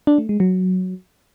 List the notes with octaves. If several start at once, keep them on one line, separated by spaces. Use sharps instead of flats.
D4
A3
G#3
F#3